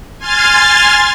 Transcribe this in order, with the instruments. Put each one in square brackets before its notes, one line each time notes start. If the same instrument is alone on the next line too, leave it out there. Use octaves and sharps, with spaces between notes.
[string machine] G#5 C6 F6 G#6 A6